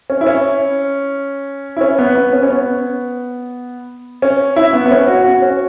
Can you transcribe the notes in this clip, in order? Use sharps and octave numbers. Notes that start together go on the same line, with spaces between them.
C#4
E4
C#4
E4
C#4
B3
B3
C#4
C#4
B3
C#4
E4
B3
B3
C#4
F#4
F#4
C#4